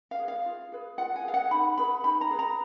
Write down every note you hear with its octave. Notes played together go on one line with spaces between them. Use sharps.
F5
G#4 B4
F5
F4
G#4 B4
F4 F#5
G#5
G#4 B4 F5
F#5
D#4 B5
G#4 B4 B5
D#4 B5
A#5
G#4 B4
A#5